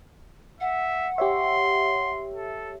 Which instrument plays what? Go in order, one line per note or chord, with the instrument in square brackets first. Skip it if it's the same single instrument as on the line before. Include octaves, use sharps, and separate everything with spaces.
[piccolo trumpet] E5 [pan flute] F#5
[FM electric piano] G4 C#5 E5 [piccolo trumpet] C6
[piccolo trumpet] A4